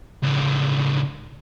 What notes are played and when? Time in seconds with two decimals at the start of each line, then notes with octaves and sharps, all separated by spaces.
0.23 C#2 A2